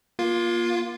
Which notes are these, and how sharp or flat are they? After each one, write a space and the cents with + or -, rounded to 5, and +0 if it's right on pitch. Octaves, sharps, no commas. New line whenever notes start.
A#3 +35 F4 +0